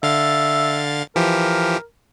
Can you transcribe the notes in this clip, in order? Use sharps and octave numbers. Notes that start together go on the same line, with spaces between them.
D3 E5 F5 A6
E3 F3 G4 A#4